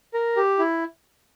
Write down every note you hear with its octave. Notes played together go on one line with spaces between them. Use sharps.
A#4
G4
E4